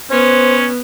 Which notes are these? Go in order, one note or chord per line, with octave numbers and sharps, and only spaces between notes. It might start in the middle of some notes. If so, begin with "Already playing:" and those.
B3 C#4 C5